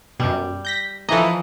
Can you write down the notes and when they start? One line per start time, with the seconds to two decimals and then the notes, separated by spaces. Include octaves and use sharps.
0.20 F#2 B2 G3
0.65 G6 A#6 B6
1.09 E3 F3 A4 D#5 A#5